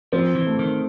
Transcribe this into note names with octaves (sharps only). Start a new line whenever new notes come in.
F3 C4
E3
A3
D#3